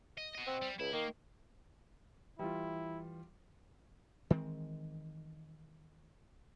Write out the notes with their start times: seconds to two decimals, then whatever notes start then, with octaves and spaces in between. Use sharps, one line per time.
0.17 D#5
0.35 F#4 D#5
0.47 C4
0.61 G3
0.80 C#2 E4
0.93 D#3 A#3
2.39 E3 G3 E4 F4
4.30 D#3 E3 G#3 C4